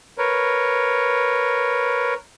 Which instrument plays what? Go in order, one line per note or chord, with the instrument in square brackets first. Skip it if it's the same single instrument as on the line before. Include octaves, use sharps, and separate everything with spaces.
[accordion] A#4 B4 C#5